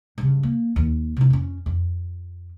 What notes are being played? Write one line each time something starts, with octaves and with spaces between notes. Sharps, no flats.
G2 C#3
A#3
D#2
C3 E4
F2 C#4
F2